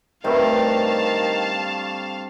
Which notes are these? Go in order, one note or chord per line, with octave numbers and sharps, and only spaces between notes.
G2 C3 D#3 A3 F5 A5